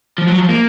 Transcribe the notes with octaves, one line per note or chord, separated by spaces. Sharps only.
F3
F#3
F3
A#3